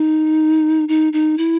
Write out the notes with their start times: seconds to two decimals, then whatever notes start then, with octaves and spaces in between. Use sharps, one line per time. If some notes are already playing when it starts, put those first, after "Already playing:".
Already playing: D#4
0.89 D#4
1.13 D#4
1.38 E4